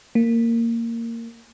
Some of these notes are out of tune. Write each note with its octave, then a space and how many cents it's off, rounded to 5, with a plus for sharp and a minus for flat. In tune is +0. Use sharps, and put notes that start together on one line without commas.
A#3 -15